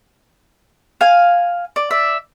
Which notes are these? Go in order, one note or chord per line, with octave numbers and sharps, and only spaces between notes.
F5 G#5
D5
D5 E5